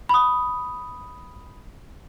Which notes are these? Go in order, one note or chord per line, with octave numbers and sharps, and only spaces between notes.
B5 D#6